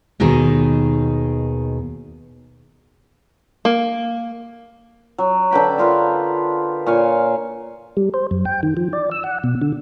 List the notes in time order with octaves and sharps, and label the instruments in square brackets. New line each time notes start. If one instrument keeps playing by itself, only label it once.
[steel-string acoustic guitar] D#2 B2 D#3 D#4 G#4
[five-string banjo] A#3
[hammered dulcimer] F#3
D3 B4 G5 B5
B3 F4 A#4 B4
A#2 C#5 F5 G#5
[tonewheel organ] G3
C5
F#2
G5
D#3
F3
D5
E6
F#5
B2
D3